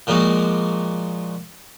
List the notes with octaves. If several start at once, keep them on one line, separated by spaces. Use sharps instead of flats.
A#2 F3 G#3 A#3 F#4